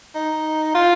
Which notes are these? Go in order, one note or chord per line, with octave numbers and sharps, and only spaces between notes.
D#4
F4